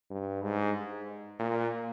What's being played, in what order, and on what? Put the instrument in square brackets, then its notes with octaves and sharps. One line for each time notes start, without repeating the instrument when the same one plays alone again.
[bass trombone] G2
G#2
A#2